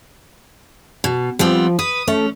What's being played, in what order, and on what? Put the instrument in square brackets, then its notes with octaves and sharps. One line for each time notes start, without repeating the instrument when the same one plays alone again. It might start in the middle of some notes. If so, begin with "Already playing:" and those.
[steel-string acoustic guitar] B2
[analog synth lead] F3 [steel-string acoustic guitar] G3 B3 C4
[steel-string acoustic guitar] B4 [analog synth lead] D#6
[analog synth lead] A3 [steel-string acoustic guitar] C#4